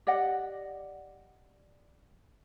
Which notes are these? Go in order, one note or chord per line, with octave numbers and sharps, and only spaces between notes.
G4 D5 D#5 F#5